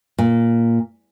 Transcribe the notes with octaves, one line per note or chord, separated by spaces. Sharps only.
A#2